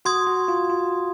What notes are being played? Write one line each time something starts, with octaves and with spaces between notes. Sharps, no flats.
F#4 C6 D#6 G#6
F#4
F4
F4